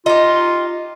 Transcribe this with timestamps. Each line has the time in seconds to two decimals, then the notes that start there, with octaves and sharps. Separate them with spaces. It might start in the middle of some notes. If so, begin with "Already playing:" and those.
0.06 D#4 F4 G4